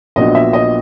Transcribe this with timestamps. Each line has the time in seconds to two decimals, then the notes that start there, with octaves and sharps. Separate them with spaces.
0.16 A#1 A#2 F#3 B3 D4 D#5
0.35 E5
0.53 D#5